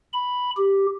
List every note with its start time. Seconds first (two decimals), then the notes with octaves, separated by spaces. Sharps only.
0.13 B5
0.57 G4